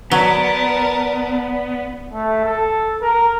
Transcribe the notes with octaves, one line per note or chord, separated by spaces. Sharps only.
F#3 B3 A#4 D5 A5
A3
A4
A#4